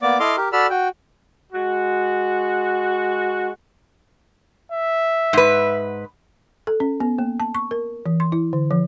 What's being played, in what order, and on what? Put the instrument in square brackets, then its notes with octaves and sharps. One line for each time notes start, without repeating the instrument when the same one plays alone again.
[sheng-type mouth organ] A#3 B3 D5 D6
E4 A4 D#5 C6 D6 F6
G4 A#4
F#4 A4 D5 B5 E6 F6
F#4 G5
[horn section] G#3 F#4
[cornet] E5
[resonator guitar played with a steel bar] G#2 B4
[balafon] A4
C#4
B3
A#3
A5
C#6
A#4
E3
C6
E4
D3
F3